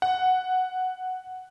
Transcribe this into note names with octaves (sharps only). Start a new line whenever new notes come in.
F#5